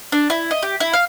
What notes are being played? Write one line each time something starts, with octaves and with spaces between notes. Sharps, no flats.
D4
E4
D#5
G4
E4
F5